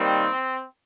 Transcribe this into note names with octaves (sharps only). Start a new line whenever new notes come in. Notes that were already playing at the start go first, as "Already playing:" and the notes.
Already playing: D#2 D#3 G3 C4